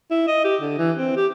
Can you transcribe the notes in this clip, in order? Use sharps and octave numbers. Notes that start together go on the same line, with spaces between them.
E4
D#5
G4
D3
E3
C4
G4